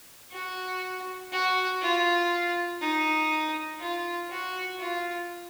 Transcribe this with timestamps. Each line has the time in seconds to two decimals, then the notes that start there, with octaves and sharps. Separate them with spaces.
0.32 F#4
1.32 F#4
1.81 F4
2.81 D#4
3.80 F4
4.30 F#4
4.78 F4